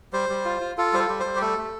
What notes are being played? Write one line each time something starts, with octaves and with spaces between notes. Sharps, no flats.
G3 C5
G3
F4
F4
F4 A4
G3 C5
A4
G3
C5
G3
G4
A3 A4
A3